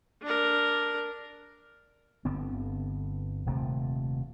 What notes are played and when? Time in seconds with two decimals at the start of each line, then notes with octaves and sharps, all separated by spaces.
0.22 D4 A#4
2.25 G1 D3 B3 C4
3.46 D#1 C3 A3